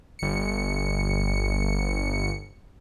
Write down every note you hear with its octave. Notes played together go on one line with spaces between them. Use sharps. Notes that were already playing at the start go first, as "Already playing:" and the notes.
G1 C#7